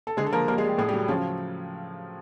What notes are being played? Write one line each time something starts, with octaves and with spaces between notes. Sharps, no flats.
A4
D3 G#3 G#4
A4
F3 A#3 A#4
G3 A#3 A#4
G#3 G#4
G3 G4
A2 G#4
G3 G4
F#3
C#3 F3 C#4